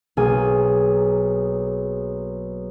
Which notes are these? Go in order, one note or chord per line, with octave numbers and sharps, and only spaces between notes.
B1 A#3 G#4 G#5